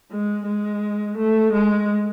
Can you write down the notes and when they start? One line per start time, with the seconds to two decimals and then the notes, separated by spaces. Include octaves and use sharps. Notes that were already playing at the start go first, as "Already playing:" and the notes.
0.11 G#3
0.47 G#3
1.18 A3
1.53 G#3